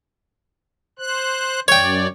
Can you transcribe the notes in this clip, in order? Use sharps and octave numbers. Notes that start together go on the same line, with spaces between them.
C5 F#6
F#2 C#5 D5 G5